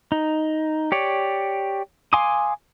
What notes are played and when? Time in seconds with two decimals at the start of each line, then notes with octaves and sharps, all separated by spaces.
0.12 D#4
0.92 G4 C#5 D5
2.13 F5 G#5 C6 D6 D#6